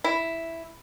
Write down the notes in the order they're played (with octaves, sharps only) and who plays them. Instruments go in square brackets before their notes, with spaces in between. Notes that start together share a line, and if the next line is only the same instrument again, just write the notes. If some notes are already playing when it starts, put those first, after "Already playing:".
[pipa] E4